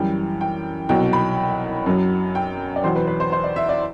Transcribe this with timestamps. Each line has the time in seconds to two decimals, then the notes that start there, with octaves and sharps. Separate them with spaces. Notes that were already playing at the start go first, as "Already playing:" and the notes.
Already playing: F#2 E3 G3 G5
0.41 G5
0.89 C2 B2 F#3 G5
1.13 B5
1.86 F#2 F#3
2.35 G5
2.76 D5
2.84 E2 B2 F#3 C5
2.96 B4
3.07 B4
3.20 C5
3.32 C5
3.44 D5
3.56 E5
3.69 D5